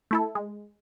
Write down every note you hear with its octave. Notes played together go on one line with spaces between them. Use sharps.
A3 E4 A4
G#3